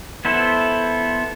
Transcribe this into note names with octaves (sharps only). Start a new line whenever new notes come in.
B3 E4 A4 C5